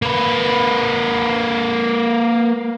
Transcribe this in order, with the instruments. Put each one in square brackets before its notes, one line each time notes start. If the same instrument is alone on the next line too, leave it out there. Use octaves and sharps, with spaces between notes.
[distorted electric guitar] A#3 B4